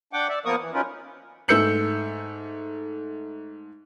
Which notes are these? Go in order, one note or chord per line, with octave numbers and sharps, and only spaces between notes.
D4 F#5 G5 D6
D5 E5
F3 A#3 B3 A#4 C#6 D#6
E3
F#3 C#4 D#4 F4 A#4 B4
G#2 A3 E6 G6 C#7 F#7